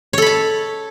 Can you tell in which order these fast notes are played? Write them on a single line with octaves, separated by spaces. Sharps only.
C#5 A4 B5 A5